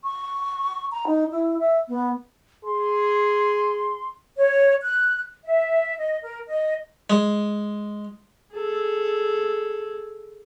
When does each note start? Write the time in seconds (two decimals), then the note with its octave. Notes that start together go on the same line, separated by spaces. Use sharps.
0.04 C#6
0.92 A#5
1.07 D#4
1.31 E4
1.59 E5
1.88 B3
2.64 G#4 C6
4.36 C#5
4.83 F#6
5.44 E5
5.98 D#5
6.23 A#4
6.47 D#5
7.10 G#3
8.54 G#4 A4